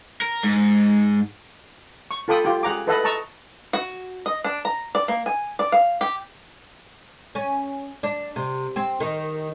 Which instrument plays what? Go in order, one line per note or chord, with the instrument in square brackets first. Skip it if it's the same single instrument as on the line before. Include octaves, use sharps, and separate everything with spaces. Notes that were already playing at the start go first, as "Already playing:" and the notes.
[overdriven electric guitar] A#4
G#2
[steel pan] C#6
F4 A4 G5 B5 D#6
F4 G4 G5
G#4 F#5 A#5 D6
A4 B4 D#5 E5 F#5 A5
D#5 A5 A#5 C#6 E6
[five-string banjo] F#4
D#5
D4
A#5
D5
A#3
G#5
D5
F5
G4
[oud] C#4
D4
C3
C4
D#3